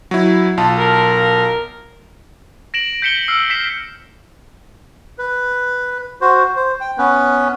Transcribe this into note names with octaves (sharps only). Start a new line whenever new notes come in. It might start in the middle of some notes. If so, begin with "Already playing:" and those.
F#3 E4
B1 F4 A5
A#4
A#6 D7 E7 F#7
G6 B6 C#7 E7 G7
E6 F6 C7 C#7
B6 C7 E7
B4
F#4 C5
C5
G5
B3 C#4 B4